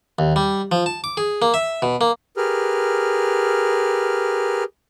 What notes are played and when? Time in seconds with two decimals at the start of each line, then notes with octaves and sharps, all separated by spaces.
0.19 D#2
0.36 G3
0.72 F3
0.86 A5
1.04 D6
1.17 G#4
1.42 A#3
1.54 E5
1.82 B2
2.01 A#3
2.37 G4 G#4 A#4 B4 F6